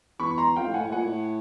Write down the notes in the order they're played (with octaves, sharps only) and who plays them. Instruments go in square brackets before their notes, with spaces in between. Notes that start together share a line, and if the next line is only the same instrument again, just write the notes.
[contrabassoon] E2 [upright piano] B5 C#6
[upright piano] A#5 C6
[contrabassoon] F2 [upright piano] F5 G5
[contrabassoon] A2
[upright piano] F#5 G#5
[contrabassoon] A2
[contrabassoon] A#2 [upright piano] F#5 G#5
[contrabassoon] A2